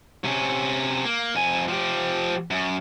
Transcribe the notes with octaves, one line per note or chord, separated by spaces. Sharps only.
C3 C#4
A#3
F2 G#5
F3 G4
F#2